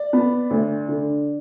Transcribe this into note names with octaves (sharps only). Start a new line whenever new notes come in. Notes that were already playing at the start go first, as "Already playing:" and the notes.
Already playing: D5
B3
D2
D3